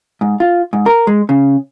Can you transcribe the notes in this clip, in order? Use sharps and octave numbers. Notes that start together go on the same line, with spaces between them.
G#2
F4
G#2
A#4
G#3
C#3